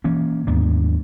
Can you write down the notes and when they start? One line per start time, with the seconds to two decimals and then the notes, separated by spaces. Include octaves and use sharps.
0.04 E3 A#3 C#4
0.47 D#2 G#2 B3 D4